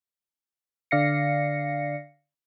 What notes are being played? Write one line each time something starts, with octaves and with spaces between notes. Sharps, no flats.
D3 D5 F5 A#6 C7 C#7